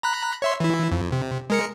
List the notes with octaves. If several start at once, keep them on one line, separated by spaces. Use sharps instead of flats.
A#5 B5 F#6
C#5 E5 C6
E3 E4
F2
C3
G#3 A#4 C#7